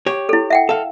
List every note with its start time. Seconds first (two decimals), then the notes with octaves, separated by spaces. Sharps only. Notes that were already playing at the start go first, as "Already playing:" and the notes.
0.06 G4 C#5
0.29 E4 A4
0.50 E5 F#5 G5
0.69 A4 F5